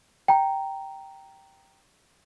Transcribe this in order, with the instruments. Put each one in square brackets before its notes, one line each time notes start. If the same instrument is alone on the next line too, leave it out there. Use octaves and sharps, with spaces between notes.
[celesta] G5 A#5